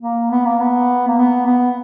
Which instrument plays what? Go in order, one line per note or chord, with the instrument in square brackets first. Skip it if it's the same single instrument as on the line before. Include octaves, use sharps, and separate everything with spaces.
[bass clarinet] A#3
B3
A#3
B3
A#3
B3
B3